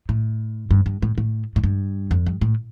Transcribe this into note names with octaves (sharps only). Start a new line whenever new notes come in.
A2
G2
G2
A2
A2
A2
G2
F2
G2
A2